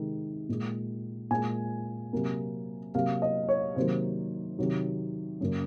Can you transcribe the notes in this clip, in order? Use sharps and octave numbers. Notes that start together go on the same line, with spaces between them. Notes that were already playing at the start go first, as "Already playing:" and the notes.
Already playing: C3 D#3 G#3
A#2 G#3
A#2 G#3 G#5
C3 F#3 A#3
C3 F#3 A#3 F5
D#5
C#5
C3 D#3 F#3 A#3 C5
C3 D#3 F#3
F#2 C#3 F#3 A#3